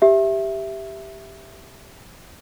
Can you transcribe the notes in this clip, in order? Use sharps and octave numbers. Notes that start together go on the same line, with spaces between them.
G4 E5